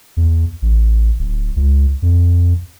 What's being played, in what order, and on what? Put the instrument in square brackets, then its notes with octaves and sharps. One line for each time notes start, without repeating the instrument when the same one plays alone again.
[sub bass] E2
A1
D1
C#2
F2